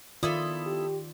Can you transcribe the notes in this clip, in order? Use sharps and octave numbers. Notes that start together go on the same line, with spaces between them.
D#3 B3 E4 F4 A4 D5
G4